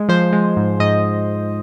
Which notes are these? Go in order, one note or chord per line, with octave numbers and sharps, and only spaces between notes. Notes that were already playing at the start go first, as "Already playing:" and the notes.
Already playing: G#3
F3 C5
G#3
G#2
G#2 D#5